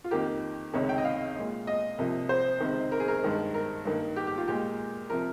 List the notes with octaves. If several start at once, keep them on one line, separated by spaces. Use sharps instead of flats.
F4
F2 D#3 A#3 G4
C#2 C3 D#3 C#5
G5
D#5
F5
A#2 G#3
D#5
C2 C3 F3 A#3
C5
C#2 C3 D#3
A#4
G#4
A#4
G2 D#3 G#3
A#4
G2 D#3 A#3
G4
G4
F4
A#2 G#3 G4
C3 F3 A#4